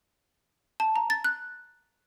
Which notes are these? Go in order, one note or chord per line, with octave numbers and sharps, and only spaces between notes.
A5
A#5
A6
F#6